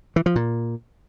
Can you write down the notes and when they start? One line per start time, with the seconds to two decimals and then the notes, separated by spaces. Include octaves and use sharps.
0.16 E3
0.26 F3
0.36 A#2